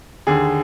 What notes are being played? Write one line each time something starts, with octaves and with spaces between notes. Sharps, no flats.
D#2 D3 G#4